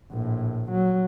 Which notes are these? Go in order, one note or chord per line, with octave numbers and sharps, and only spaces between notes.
A#1 A2
F#3